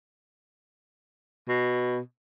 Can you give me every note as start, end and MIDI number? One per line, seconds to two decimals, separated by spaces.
1.48 1.99 47